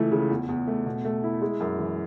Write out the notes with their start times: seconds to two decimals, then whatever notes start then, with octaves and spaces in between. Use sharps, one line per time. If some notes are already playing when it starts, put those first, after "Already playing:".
Already playing: C#2 E3 A3
0.12 C#3
0.31 E2
0.49 E2
0.67 A3
0.86 B2
1.05 A3
1.24 E4
1.41 G#3
1.60 F#2
1.79 E3